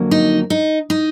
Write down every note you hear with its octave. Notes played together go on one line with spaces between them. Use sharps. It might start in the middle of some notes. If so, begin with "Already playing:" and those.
Already playing: F2 D3 F#3 A#3
D#4
D#4
D#4